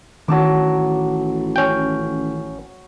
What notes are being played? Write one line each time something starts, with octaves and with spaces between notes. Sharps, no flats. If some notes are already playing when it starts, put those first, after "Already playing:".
A1 D#3 F#3 A5 D6
C#4 G5